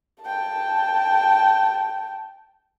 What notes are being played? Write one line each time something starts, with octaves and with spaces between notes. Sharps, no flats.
G5 A5